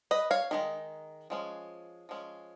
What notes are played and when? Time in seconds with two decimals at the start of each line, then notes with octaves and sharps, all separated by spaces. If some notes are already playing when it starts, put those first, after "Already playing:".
0.11 B4 D#5
0.31 C#5 F5
0.51 D#3 G#3 D#4
1.30 F3 G#3 C#4
2.09 F3 G#3 C#4